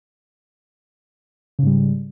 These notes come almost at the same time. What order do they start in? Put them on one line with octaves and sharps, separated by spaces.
C#3 G#2 G3